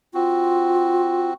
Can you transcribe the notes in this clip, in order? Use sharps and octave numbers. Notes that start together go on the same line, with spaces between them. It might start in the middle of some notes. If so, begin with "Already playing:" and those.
C4 F4 F#4